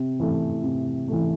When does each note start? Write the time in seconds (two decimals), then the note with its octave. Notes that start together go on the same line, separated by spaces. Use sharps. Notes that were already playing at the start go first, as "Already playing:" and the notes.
Already playing: C3
0.20 E3 A3
0.64 C3
1.08 E3 A3